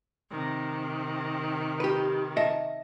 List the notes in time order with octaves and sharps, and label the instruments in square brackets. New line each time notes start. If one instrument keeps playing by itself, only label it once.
[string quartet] C3 D#3
[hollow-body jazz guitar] G4 B4
D#5 E5 A5